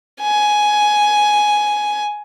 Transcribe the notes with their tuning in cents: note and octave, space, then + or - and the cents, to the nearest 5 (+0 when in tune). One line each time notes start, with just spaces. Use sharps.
G#5 +10